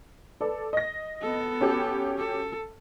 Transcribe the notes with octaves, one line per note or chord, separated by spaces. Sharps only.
A4 B4 D5
D#5 A#6
B3 A4
C#4 F#4 G4
A4